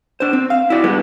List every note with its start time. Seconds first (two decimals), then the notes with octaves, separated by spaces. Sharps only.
0.20 D4 C5
0.33 C4
0.50 F5
0.70 E4 F#4 D5
0.84 G2 G#3 B3 D4